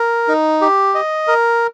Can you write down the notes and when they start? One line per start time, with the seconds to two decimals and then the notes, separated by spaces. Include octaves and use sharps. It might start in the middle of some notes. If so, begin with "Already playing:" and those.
Already playing: A#4
0.28 D#4
0.61 G4
0.95 D#5
1.27 A#4